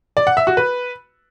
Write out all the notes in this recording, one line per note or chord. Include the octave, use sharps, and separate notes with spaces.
D5
F#5
E5
F#4
B4